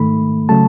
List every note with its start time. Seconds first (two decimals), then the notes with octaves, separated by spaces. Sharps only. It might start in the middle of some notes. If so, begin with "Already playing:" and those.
Already playing: G#2 D#3 A3 B5
0.49 C#3 F#3 A3 A5